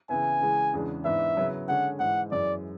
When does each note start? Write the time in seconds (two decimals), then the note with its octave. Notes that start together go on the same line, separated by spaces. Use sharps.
0.09 C#3 E3 B3 E4 G#5
0.41 C#3 E3 G#3
0.73 E2 C#3 E3 G#3 D4
1.04 G#2 E3 B3 D4 E5
1.37 C#3 F#3 B3 E4
1.68 D3 G#3 C#4 F#5
1.99 G#2 E3 G#3 F#5
2.31 F#2 E3 G#3 D5